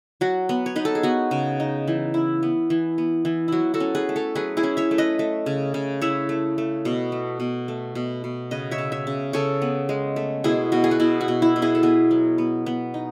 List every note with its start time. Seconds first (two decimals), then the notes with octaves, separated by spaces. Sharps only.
0.21 F#3 F#4
0.49 B3
0.66 C#5
0.76 D#4 B4
0.85 A4
0.95 G#4
1.03 B3 F#4
1.31 C#3
1.60 D#4
1.88 E3
2.14 E4
2.43 B3
2.70 E3
2.98 B3
3.25 E3
3.48 F#3 E4 F#4
3.74 F#4 A4
3.80 C#4
3.95 G#4 B4
4.09 A3
4.16 A4 C#5
4.35 F#3 G#4 B4
4.57 E4 G#4
4.63 C#4
4.77 C#5 E5
4.91 A3
4.98 B4 D#5
5.19 A3
5.46 C#3
5.74 C#3
6.01 E4 C#5 E5
6.29 A3
6.58 A3
6.85 B2
7.12 A3
7.40 B2
7.68 A3
7.95 B2
8.24 B2
8.51 C#3 B4 D#5
8.71 C#5 E5
8.78 C#3
8.92 C#5 E5
9.07 C#3
9.33 C#3 A4 C#5
9.62 B3
9.89 G#3
10.16 A3
10.44 B2 E4 G#4
10.72 B2 F#4
10.84 G#4
10.91 F#4
11.00 B2 E4
11.21 F#4
11.28 B2
11.42 E4
11.56 B2
11.62 E4 G#4
11.75 A4
11.83 B3 G#4 B4
12.11 F#3
12.38 B3
12.66 B3
12.94 D#4